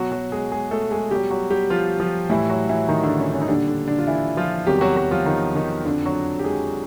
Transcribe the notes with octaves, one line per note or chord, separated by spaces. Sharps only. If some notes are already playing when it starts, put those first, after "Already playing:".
Already playing: B2 F#3 F#4
F#3 F#4
G#3 G#4
G#3 G#4
A3 A4
G#3 G#4
B2 F#3 G3 G4
F#3 F#4
G3 G4
F3 F4
F3 F4
A2 E3 G3 E4
F#3 F#4
E3 E4
D#3 D#4
D3 D4
C#4
C#4
D#4
A#2 D3 G3 D4
D3 D4
D3 D4
F4
E3 E4
F3 F4
E2 C3 D#3 F#3 G3 G4
F#3 F#4
F#3 F#4
F3 F4
D#3 D#4
D#3 D#4
F2 D3 F3 D4
F#3 F#4
G4
G#3 G#4